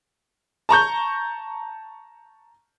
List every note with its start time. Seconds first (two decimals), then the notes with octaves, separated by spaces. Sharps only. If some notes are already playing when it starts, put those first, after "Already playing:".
0.69 A5 A#5 C#6 G6